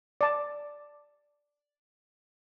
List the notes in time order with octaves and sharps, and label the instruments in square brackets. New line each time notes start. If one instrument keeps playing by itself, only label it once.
[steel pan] D5 A5